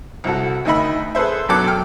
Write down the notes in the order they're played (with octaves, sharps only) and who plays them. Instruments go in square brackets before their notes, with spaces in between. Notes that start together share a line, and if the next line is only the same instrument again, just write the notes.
[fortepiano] C2 E4 F#4 A4
D2 D#3 D#5 E5 B5
G#4 A4 B4 C5 E5
B1 F#2 F#3 A4 D6 F#6
G5 F6